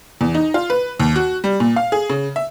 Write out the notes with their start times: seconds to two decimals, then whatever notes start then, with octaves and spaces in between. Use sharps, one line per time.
0.21 E2
0.35 D#4
0.54 F4
0.70 B4
1.00 D#2
1.16 F#4
1.44 G3
1.60 A#2
1.76 F5
1.92 G#4
2.09 C#3
2.36 E5